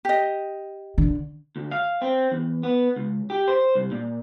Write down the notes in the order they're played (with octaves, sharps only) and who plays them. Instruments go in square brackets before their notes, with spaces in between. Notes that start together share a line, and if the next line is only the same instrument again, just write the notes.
[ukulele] G4 D#5
[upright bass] D3
[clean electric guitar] D2
F5
C4
E2
B3
C#2
G4
C5
C2
A#2